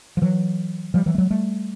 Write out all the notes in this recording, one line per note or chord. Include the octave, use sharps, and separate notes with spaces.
F3
E3 F#3
F3 G3
E3 F#3
A3
F#3 G#3
G3 A3